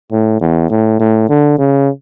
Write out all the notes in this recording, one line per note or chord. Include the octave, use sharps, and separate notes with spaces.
A2
E2
A2
A2
D3
C#3